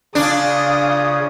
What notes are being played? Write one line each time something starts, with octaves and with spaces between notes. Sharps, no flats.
C#3 D4 F4 D#6